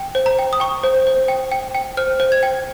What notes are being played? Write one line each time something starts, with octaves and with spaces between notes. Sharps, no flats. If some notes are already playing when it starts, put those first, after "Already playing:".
Already playing: G5
C5
A#5
G5
D#6
G5 C#6
C5
C5
G5
G5
G5
C5 F6
C5
G#6
G5